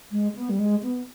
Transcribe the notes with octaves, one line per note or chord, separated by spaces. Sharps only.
G#3
B3
G3
G#3
B3